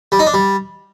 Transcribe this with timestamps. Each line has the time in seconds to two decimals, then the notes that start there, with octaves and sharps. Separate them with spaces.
0.12 G3
0.19 D#4
0.26 D4
0.34 G3